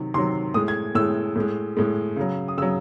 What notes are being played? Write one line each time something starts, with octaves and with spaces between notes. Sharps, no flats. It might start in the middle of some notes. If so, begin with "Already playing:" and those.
Already playing: C3 D#3 F#3
C3 D#3 F#3 C6
A2 G#3 D#6
G#6
A2 G#3 E6
A2 G#3
A2 G#3
C#3 F#3
D#6
C#3 F#3 E6